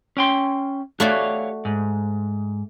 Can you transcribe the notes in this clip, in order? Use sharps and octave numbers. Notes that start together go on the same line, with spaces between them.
C#4 G5 C6
A3 F#4 G4 C#5 D5 F5
G#2